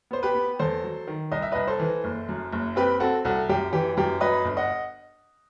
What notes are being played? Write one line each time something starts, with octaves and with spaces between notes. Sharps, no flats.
B3 C5
G4 B4
B3
E2 A4 C5
F#3
D#3
C2 D#5
E5
C2 B4 D#5
A4 C5
E3
F#1
F#2
F#1
C4 G4 B4
C4 F#4 A4
C2 F#4 A4
F#2 G4
E3 G4
F#2 G4
F#3 B4 D#5
G1
D#5 F#5